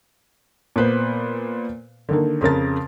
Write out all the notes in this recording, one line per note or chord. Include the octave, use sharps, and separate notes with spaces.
A#2 B3 B4 C5
D3 D#3 A#3
F2 C#3 A#4 A6